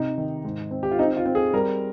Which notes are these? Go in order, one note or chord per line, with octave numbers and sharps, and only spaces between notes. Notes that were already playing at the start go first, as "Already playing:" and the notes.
Already playing: C3 C4 D#4
D#3
G#2
C4
G4
F4
C4 D#4
F4
C4
G#4
G3 A#4